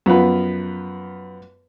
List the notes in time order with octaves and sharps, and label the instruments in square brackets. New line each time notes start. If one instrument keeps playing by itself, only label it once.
[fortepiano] F#2 F3 B3 B4